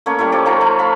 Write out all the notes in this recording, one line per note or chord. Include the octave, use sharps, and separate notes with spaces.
A3 A#3 C#4 C#5
G3 A3 A#3 E4
F3 G3 C#5 D5
F3 A3 D#4 F4
A3
F5 B5